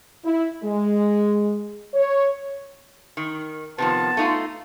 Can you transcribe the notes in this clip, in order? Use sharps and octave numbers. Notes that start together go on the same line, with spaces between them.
E4
G#3
C#5
D#3
C3 D#3 F3 B3 A5
A3 D#4 F4